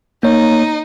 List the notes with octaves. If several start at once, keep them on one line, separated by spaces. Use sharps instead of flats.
A#3 D#4 C#5